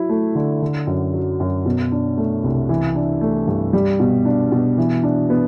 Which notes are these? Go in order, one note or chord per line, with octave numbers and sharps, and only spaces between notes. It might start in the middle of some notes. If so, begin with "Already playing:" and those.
Already playing: F#3 E4
A3
D3
D3
F#2
F#3
F#2
B2
D4
A3
C2
E3
D4
A3
G2
G3
B2
D4
B2
E3
D4
B3